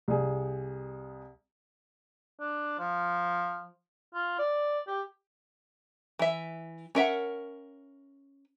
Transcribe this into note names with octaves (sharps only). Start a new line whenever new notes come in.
C2 G#4
D4
F3
F4
D5
G4
E3 E5
C#4 A#4 E5 F#5